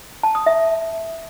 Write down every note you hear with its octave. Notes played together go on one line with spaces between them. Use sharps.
A5
D#6
E5